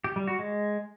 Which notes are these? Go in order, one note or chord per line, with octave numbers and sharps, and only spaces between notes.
G4
G3
F#4
G#3